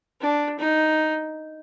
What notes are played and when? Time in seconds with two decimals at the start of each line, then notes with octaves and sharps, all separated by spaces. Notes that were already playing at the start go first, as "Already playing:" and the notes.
0.21 D4
0.58 D#4